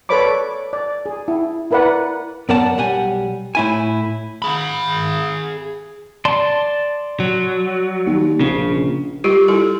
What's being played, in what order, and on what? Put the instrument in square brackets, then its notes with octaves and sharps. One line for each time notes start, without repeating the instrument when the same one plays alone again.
[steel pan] A4 B4 C#5 D5 B5 D6
D5
G#4
E4
E4 A#4 B4 D5 F#5
[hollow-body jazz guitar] F#2 B3 A#4 D5 F#5 A5
B1 G3 F#5 G#5
A2 E4 G#5
[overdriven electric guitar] G#4 B5
[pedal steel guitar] D5 A5 C6
[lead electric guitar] F#3
[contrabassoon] D#2
[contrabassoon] A#1 [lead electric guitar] C#3
[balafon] G3 F4 G4
G3 E4 A4